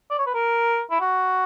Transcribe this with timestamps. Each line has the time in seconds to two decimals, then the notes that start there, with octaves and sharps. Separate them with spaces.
0.10 D5
0.18 C#5
0.27 B4
0.34 A#4
0.91 E4
1.00 F#4